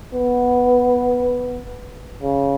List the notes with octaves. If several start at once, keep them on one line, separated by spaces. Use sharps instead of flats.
B3
C#3